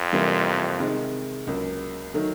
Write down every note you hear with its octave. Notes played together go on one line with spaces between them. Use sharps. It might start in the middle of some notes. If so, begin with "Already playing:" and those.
Already playing: F2
C3 E3 G3 A#3
C3 D#3 G#3
C#2 C#3 F#3 A#3
D#3 F#3 A3